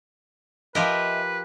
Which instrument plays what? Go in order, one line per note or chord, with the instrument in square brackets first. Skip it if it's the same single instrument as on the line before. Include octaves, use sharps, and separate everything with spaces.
[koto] F3 G4 A#4 [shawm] B4 [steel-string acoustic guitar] D#5 E5 G#5